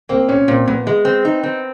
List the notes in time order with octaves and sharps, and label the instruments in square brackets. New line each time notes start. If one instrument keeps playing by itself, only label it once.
[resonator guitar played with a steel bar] A#3 [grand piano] C4
[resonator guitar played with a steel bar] A#2 [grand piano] C#4
[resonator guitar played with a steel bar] A#2 [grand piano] C4
[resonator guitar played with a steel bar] A#2 [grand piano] B3
[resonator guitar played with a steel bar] G#3
C4
D#4
C4